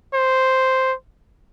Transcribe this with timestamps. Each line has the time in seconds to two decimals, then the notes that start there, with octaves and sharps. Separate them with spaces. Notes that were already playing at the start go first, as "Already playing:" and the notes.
0.14 C5